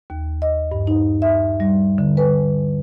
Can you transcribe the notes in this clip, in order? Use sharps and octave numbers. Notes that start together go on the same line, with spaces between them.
D#2
D#5
G2
D#4
E5
G3
D3
B4